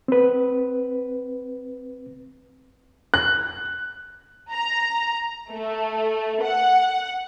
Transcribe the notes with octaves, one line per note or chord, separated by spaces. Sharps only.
C4 B4
F#6
A#5
A3
F#5